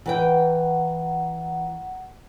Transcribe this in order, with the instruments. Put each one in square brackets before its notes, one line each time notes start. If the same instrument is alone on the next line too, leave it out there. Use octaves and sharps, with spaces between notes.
[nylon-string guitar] E3 B4 G5 [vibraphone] F#5 A#5